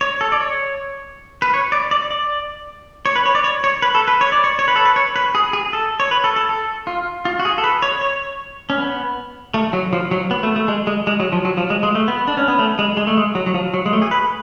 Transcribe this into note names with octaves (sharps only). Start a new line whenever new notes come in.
C#5
A4
D5
C#5
B4
C#5
D5
D5
D5
C#5
B4
C#5
D5
C#5
C#5
B4
A4
B4
C#5
D5
C#5
C#5
B4
A4
B4
C#5
B4
G#4
G#4
A4
C#5
B4
A4
A4
A4
F4
F4
F#4
G#4
A4
B4
C#5
C#5
C#4
B3
A3
F#3
F3
F#3
B3
A3
A3
G#3
G#3
G#3
F#3
F3
F#3
F3
G#3
G#3
A3
B3
D4
C#4
B3
A3
G#3
G#3
A3
G#3
F#3
F#3
F3
F#3
G#3
A3
G#4
B4